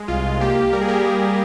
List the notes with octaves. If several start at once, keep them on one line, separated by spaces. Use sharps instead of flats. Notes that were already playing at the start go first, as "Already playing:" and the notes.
Already playing: G#3
C2 F4
C2
A#3 G4
A#3
G3 A#4
G#4
G4 A#4